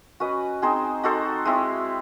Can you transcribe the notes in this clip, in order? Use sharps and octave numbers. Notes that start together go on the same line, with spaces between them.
C#4 F#4 B4 D#5
C4 D#4 G#4 C5
D#4 F#4 A4 C5
G#3 C4 E4